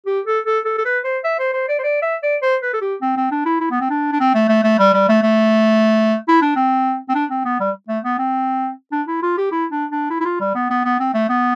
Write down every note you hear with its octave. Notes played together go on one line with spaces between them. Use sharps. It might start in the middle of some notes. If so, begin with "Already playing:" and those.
G4
A4
A4
A4
A4
B4
C5
E5
C5
C5
D5
C5
D5
E5
D5
C5
B4
A4
G4
C4
C4
D4
E4
E4
B3
C4
D4
D4
C4
A3
A3
A3
G3
G3
A3
A3
E4
D4
C4
C4
D4
C4
B3
G3
A3
B3
C4
D4
E4
F4
G4
E4
D4
D4
E4
E4
F4
G3
B3
B3
B3
C4
A3
B3